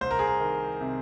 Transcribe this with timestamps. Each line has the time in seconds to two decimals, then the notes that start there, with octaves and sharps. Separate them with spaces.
0.01 C2 C5
0.11 A#4
0.19 G#4
0.27 A#4
0.41 D#3
0.81 C3